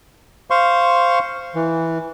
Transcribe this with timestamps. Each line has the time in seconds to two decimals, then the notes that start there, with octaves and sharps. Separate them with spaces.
0.50 C5 F5 C6 C#6
1.55 E3